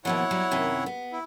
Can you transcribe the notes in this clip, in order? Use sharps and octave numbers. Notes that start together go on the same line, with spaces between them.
D#2 B2 F3 E4 C#5 F#5
F#3 G3
F#2 C3 D#3
B3
E4